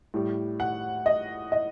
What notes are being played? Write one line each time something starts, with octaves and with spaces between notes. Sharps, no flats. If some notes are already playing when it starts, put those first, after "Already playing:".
A2 G3
F#5
D#5
D#5